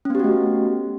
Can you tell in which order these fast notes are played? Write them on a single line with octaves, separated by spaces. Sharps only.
C#4 B3 G4 F#4 A3